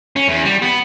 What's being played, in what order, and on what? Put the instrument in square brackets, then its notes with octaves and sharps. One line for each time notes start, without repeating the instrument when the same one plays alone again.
[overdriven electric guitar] C#4
E2
G3
B3